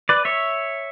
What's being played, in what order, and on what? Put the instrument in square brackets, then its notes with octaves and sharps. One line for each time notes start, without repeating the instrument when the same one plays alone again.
[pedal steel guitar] B4 D5
C#5 E5